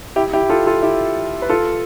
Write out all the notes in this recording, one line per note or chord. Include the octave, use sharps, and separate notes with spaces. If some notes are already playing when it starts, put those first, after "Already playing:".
E4 G4
E4 G4
F4 A4
F4 A4
E4 G4
B4
F4 A4